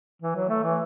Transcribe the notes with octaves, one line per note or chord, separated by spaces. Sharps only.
E3
F#3
A3
E3